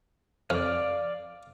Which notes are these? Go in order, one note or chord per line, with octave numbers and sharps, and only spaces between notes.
F2 D5 F5